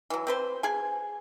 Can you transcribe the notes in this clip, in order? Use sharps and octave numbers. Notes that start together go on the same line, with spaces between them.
E3 F#3
C4 B4 C5
G#4 G#5